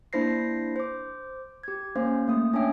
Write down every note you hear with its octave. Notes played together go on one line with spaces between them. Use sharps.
A#3 D4 E4 C5 A#6 C7
C5 D6
G4 G#6
A#3 C#4 C5 F5
A3 A#3 D#6
C#4 D4 C#5 E5 G5